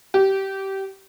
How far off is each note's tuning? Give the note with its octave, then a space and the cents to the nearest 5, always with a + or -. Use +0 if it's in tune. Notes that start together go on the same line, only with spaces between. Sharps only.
G4 -20